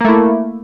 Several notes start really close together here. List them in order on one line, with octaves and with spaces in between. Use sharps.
A#3 A3 E4